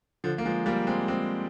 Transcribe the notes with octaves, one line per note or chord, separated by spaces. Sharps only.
D3 F3
A#3
F3 G#3
G3 A#3
G#3 C4
G#3 C4